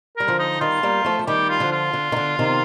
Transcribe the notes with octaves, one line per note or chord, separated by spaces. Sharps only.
G3 A#4
D3 F3
D#4
D#3 G3 F4
G3 A#3
F3 A3
F3
D#3 G3 G4
F4
D3 F3
F4
D3
D#3
D3
C3 D#3